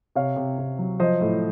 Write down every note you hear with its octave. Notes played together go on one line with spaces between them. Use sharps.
C3 C#5 F5
C3
C3
F#3
F3 C5 D#5
A2